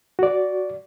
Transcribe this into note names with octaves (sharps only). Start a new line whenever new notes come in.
F#4 D5